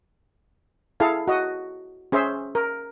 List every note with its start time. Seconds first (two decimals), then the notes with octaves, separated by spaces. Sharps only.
1.00 E4 G#4 A4 F5
1.28 F#4 D#5
2.12 C#4 G#4 C5 E5
2.55 A#4